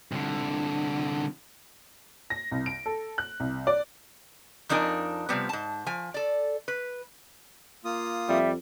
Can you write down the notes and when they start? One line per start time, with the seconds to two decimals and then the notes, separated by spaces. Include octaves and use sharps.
0.12 C2 D3
2.30 A#6
2.51 C2
2.66 D7
2.86 A4
3.18 F#6
3.40 C2
3.67 D5
4.69 F2 F3 D4 D#4 A#4 G#5
5.29 C3 F3 G3 B3
5.49 G#2 A5
5.86 F3 G#5
6.14 A4 D5
6.68 B4
7.85 A#3 F4 D#6
8.28 F2 G3 E5